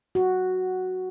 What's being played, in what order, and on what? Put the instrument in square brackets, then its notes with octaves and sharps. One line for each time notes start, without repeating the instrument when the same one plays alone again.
[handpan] F#4